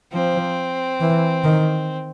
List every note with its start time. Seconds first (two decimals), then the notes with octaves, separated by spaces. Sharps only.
0.12 F3 C4
1.00 E3
1.44 D#3